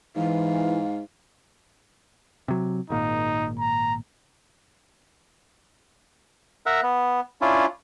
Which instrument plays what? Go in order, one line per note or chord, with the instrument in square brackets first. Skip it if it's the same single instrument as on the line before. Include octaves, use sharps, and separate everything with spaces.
[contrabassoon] G#2 [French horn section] E3 [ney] F5
[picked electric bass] C3 F#3
[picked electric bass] G#1 A#2 [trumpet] D#4
[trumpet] A#5
[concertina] A#4 E5 F#5
B3
C#4 D4 E4 F4